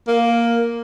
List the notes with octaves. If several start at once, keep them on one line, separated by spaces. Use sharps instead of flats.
A#3